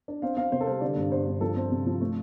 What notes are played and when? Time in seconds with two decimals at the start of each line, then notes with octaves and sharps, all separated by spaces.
0.08 D4
0.22 C4 F5
0.37 C4 F5
0.52 C3 C5
0.61 A4
0.67 G3 C5
0.81 D3 D5
0.96 G2
1.11 G2 C5
1.27 G2
1.41 F3 A4
1.56 C4
1.71 C3
1.86 F3
2.01 A3